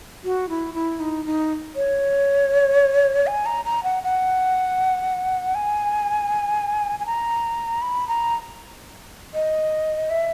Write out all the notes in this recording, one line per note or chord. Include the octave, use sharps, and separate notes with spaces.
F#4
E4
E4
D#4
D#4
C#5
G#5
A#5
A#5
F#5
F#5
G#5
G#5
A#5
B5
A#5
D#5
E5